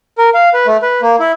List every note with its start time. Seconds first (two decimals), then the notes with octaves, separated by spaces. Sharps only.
0.18 A#4
0.34 F5
0.54 B4
0.67 A3
0.82 B4
1.02 A#3
1.20 E4